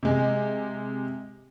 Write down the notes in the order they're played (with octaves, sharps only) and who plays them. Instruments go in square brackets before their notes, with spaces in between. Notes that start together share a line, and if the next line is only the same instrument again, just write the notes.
[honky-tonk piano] C3 G#3